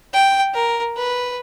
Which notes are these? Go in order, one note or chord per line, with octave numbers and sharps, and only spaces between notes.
G5
A#4
B4